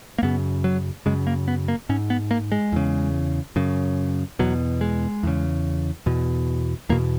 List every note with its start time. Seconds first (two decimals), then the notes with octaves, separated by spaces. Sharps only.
0.18 A#3
0.23 F#2 C#3 B3
0.64 F#3
1.06 F#2 C#3 G#3
1.27 A#3
1.48 B3
1.68 A#3
1.89 G#2 C#4
2.10 B3
2.31 A#3
2.52 G#3
2.72 E2 C#3
3.56 F#2 C#3
4.39 E2 B2 F#3
4.81 G#3
5.23 E2 C#3
6.06 E2 B2
6.89 E2 B2 A#3